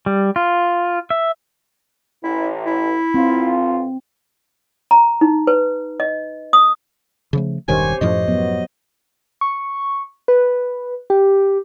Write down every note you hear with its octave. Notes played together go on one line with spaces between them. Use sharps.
G3
F4
E5
A1 E4
E4
B1 C4 F4
A#5
D#4
B4
D#5
D#6
C#3 F3 A3
E1 G2 D#3 G4 C5 C#5 G#5
F#2 A2 F3 D#5
F#3 B3
C#6
B4
G4